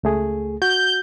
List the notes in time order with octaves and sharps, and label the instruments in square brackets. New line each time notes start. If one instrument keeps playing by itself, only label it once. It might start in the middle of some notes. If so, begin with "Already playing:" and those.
[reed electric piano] C#2 A3 G#4
[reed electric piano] F#4 [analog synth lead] G6